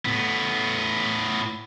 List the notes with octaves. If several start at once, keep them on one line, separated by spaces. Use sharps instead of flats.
A2 B3